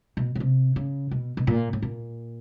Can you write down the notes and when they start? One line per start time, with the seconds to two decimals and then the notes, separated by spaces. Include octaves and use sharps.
0.17 B2
0.35 C#3
0.40 C3
0.76 C#3
1.11 B2
1.37 B2
1.47 A#2
1.73 A2
1.82 A#2